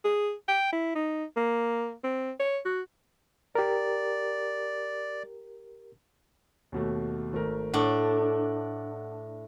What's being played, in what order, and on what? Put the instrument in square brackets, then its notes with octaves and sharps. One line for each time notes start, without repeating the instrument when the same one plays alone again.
[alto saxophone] G#4
G5
E4
D#4
A#3
C4
C#5
F#4
[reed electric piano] G4 A#4 [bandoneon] D5
[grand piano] D#2 B2 A3
G#1 A3 A#4
[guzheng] A2 D4 [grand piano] F#5